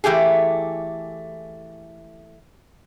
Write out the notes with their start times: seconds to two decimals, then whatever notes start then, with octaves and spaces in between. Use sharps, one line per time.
0.04 E3 A3 G4 G#4